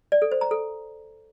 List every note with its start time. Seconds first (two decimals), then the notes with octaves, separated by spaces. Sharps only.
0.12 D5
0.22 A4
0.32 C5
0.41 A#5
0.51 A4